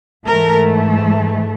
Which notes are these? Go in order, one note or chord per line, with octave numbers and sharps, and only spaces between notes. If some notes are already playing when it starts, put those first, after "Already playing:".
G#2 E3 A3 A#4